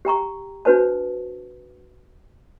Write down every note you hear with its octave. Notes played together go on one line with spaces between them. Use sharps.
G4 G5 A#5 C#6
D4 F#4 B4 C5 A5